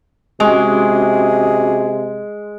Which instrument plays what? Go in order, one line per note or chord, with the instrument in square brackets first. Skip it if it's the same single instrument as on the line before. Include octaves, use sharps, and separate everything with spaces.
[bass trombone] C3 [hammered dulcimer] G#3 [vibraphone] C#4 F#4 D6 [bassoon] G#4